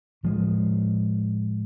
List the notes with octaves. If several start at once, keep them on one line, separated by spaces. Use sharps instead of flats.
A2 F3 G#3